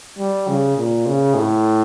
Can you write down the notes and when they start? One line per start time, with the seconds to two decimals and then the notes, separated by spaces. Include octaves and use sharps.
0.19 G3
0.48 C#3
0.77 A#2
1.06 C#3
1.35 A2